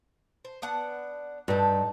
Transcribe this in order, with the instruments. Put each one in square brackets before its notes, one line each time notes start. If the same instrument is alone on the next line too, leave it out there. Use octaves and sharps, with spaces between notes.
[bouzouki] C5
B3 D4 F#5
[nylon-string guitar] G2 [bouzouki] D#4 A4